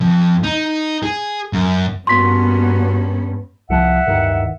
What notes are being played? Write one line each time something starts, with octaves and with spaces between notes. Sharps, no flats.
F2
D#4
G#4
F#2
G2 A#3 B3 C#4 F#4 C6 B6
C2 F3 E5 F#5
D1 G2 D#3